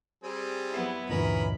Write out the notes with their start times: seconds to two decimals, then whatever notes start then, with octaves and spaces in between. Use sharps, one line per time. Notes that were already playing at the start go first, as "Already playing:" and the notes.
0.23 G3 C4 G#4
0.72 F#3 B3 E4
1.10 D2 G2 A#2 E3 C#4 A#4 D#5 B5